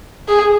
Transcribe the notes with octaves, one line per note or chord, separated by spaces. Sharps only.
G#4